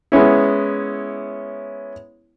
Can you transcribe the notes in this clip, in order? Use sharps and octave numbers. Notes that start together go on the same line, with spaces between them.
G#3 B3 C#4 E4